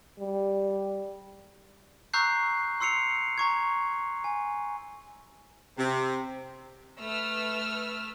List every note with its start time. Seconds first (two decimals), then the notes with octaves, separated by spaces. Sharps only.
0.19 G3
2.13 A#5 C#6 E6 F#6 G6 C7
2.80 C6 E6 C7 C#7 F7
3.38 A#5 C#6 G#6
4.24 G#5
5.77 C3
7.00 A3 B4 E6 F6